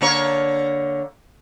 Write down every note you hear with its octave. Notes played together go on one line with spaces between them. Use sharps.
D3 A#3 C#5